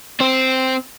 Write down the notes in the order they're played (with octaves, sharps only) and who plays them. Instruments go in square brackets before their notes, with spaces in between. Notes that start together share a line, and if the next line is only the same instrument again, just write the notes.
[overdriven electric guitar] C4 C5